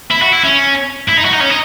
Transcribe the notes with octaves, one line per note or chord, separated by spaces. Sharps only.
E4
F#4
E4
C#4
E4
D#4
F#4
D#4
C#4
D#4